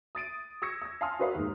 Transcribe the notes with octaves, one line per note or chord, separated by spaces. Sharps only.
D#6 A6 D7 D#7
C#6 D#6 E6 G#6 A#6 C#7
E6 G#6
F5 G#5 A5 C6 D#6 F6
F#4 A#4 B4 D5 F5 D#6
D#2 G#2